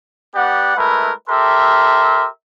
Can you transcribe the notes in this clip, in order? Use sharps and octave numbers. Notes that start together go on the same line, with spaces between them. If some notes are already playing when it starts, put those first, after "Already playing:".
B3 G4 D5 F#5
G#3 A3 E4 A#4 B4
G4 A4 A#4 E5 C6